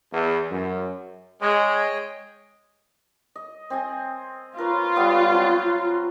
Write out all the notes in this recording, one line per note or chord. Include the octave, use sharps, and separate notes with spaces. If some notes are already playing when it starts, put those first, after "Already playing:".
E2
F#2
G#3 C#5 D#5 G5
D#5
C4 D#5 G#5
F4 A#4 B4 C#5
G3 B3 F#4
F#3 C4 B4